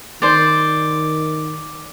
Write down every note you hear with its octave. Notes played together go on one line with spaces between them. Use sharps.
D#3 C5 D5